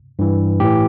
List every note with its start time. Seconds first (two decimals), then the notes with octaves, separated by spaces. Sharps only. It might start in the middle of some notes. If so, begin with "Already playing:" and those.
0.19 G2 E3
0.60 A2 E3 G4